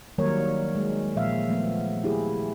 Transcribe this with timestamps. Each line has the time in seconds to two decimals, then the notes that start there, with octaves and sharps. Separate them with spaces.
0.18 D#3 F#3 G3 A#3 A#4 C#5
0.75 G#3
1.16 A#2 F3 E5 F5
1.49 F3 A3 B3
2.04 E4 G4 G#4